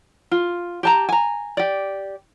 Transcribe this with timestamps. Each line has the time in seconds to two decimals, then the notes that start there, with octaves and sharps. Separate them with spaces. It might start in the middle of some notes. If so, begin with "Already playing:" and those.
0.31 F4
0.83 G4 A5 A#5
1.09 G#5 A#5
1.57 G4 D5